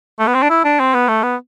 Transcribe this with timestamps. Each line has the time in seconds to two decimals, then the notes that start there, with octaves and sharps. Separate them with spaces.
0.19 A3
0.27 B3
0.34 C4
0.42 D4
0.50 E4
0.64 D4
0.80 C4
0.94 B3
1.08 A3
1.23 B3